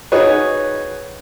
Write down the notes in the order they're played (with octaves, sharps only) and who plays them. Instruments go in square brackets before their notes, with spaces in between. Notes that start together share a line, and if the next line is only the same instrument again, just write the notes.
[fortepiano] D#4 F#4 G#4 B4 C#5